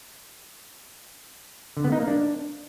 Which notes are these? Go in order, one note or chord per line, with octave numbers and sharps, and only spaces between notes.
D3
B3
D#4
A#3
D4